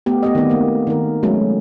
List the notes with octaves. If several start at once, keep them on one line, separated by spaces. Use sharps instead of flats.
A3 B3 G4
B3 G4 D#5
D#3 G3 B3 C4
A3 A#3
D#3 A#4
F#3 G#3 A3 C#4